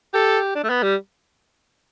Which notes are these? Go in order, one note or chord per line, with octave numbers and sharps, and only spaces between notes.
G4 A4
D4
A3
B3
G3